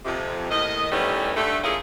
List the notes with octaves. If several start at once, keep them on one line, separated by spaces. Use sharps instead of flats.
F2 C3
D#2 A2 D#3 D#5
D#3 E3 G3 A3 B3 C#4
G2 D3 G3 A3
G#3 A#3 C#4 E4 F4 G#4